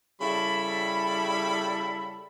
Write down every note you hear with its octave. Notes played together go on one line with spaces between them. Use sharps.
C#3 G3 E4 A4 B5